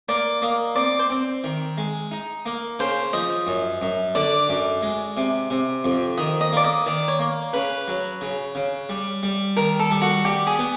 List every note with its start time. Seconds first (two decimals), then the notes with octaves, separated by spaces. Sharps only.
0.09 A#3 D5
0.42 A#3 D#5
0.75 C4 D5
0.99 C5
1.10 C4
1.44 D#3
1.78 G#3
2.11 D#4
2.46 A#3
2.79 C#3 C5
3.13 F3 D#5
3.47 F#2
3.82 F#2
4.15 D3 D5
4.49 F#2
4.82 G#3
5.17 C3
5.50 C3
5.84 F2
6.18 D#3 D#5
6.41 D#5
6.52 A#3 D5
6.64 D#5
6.86 D#3 D5
7.08 C#5
7.19 A#3
7.53 C#3 B4
7.88 F#3
8.21 C#3
8.55 C#3
8.89 G3
9.23 G3
9.56 D#3 A#4
9.79 A4
9.91 G3
10.02 F#4
10.25 G3 G4
10.47 G#4
10.59 B3